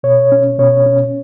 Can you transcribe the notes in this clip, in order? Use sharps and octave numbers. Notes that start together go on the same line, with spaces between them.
B2 C#5
C#4
B2 C#5
C#4